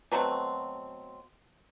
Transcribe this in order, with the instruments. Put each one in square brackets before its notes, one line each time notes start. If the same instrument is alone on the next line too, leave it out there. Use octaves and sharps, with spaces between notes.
[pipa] B2 F#3 A3 C4